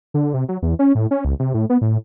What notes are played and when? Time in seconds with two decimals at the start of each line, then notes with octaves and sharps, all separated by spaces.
0.14 D3
0.34 C3
0.49 F#3
0.62 E2
0.79 C#4
0.95 A2
1.11 C#4
1.25 C#2
1.39 C3
1.54 A2
1.70 B3
1.81 A2